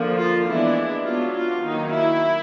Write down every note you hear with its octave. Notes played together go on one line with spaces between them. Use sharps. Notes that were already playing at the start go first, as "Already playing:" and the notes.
Already playing: D3 F3 A#3
F4
E3 G#3 B3 D4 E4
F#3 B3 D4 F4
F4
D#3 F#3 A#3 D#4
E4